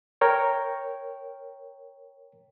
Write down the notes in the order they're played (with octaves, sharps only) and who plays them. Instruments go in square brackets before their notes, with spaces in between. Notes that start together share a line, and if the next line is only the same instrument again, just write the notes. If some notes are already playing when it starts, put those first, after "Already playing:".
[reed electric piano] A#4 C#5 G5